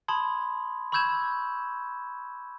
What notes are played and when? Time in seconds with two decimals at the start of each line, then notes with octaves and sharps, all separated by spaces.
0.08 A5 B5 C6 D#6 G#6
0.92 B5 C#6 E6 G6 G#6 E7